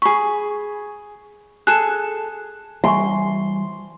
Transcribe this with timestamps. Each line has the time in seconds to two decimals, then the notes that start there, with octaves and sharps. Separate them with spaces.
0.02 G#4 B5 C#6
1.67 G#4 A4 F#6 E7
2.84 E3 G3 E5 G#5 C6 C#6